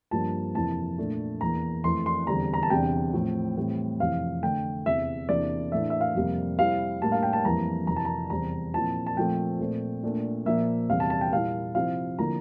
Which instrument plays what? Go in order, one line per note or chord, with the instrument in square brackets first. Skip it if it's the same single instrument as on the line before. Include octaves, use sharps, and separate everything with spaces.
[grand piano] G2 F3 A#3 A5
F2 C3 E3 A#3 E4 A5
A#2 A3 D4
E2 E3 A#3 A#5
F2 E3 A3 C6
C6
E2 D3 G3 C4 A#5
A#5
A5
E2 C3 G3 D4 G5
A2 F3 C4
A2 E3 G3 C4
F2 C3 E3 F5
D3 A3 D4 G5
E2 C3 E3 E5
E2 C3 E3 A#3 D4 D5
A2 E3 A3 D4 E5
E5
F5
F2 C3 G3 A#3
C3 G3 C4 E4 F5
A2 G3 A#3 D4 A5
F5
G5
A5
F2 E3 G3 A#3 A#5
F2 C3 E3 A#5
A5
A#5
E2 C3 G3 C4 A#5
A#2 F3 C4 E4 A5
A5
A#2 F3 A3 C4 G5
A#2 A3 C4
A#2 A3 D4
A#2 F3 A#3 E5
E2 C3 G3 F5
A5
A5
G5
A#2 G3 A#3 E4 F5
C3 F3 C4 E4 F5
D3 F3 A#3 E4 A#5